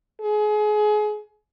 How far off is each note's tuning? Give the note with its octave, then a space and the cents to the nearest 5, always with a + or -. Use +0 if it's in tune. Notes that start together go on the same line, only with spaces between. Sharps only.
G#4 +30